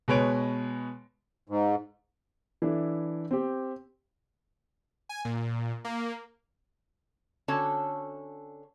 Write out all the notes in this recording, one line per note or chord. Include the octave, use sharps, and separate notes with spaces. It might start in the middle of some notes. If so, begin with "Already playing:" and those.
B2 G#3 B4 C#5 D7
G#2
E3 D4 E4 A4
C4 G4
G#5
A#2
A#3
D3 C#4 F#4 A4 C#5 A5